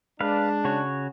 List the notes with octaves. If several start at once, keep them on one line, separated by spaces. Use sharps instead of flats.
G#3 D4 B4 F5
C#3 F#4 C#5